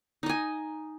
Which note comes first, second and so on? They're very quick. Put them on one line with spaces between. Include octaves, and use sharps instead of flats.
D#4 D#5 G#5